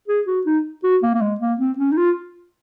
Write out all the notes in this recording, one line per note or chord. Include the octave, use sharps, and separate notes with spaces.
G#4
F#4
D#4
F#4
A#3
A#3
G#3
A#3
C4
C#4
D#4
F4